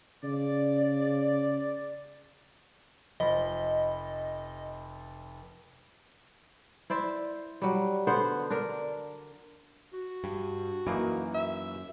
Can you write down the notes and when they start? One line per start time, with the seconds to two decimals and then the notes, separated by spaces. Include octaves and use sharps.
0.24 C#3 D5
3.20 F1 F3 D#5 B5
6.90 E4 C5 D5 E5
7.62 F#3 G3
8.07 D3 B3 C5 F#5
8.50 D4 A#4
9.93 F#4
10.24 G2
10.87 F#2 E3 A#3 D#4
11.34 E5